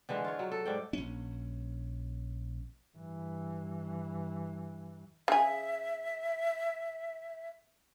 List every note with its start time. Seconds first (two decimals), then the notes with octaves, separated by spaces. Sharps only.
0.09 D3 E3 G#3
0.24 F4 C#5
0.39 F#3
0.51 A4
0.65 G#2 D5 G5
0.93 A#1 C#4
2.97 G2 E3
5.28 C#3 G#4 E5